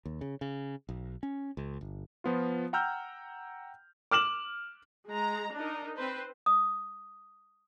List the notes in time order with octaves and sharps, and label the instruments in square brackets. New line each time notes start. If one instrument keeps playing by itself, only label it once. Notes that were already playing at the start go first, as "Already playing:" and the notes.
[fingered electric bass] D#2
C#3
C#3
B1
C#4
C#2
G1
[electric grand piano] F3 B3 F4
F#5 G5 A#5 E6 F6 G6
[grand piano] D6 F6 E7 F#7
[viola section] G#3 A#5
D4 D#4 A#4
C4 B4 C5
[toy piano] D#6